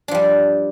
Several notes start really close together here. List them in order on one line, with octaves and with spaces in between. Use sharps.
D4 F3 G3